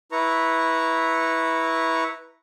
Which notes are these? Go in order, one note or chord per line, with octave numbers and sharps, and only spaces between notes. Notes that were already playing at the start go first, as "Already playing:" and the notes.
E4 B4 A#5 C#6